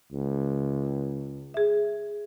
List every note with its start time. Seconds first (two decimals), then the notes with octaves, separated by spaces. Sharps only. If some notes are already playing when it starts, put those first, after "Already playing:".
0.13 C#2
1.54 G#4 E5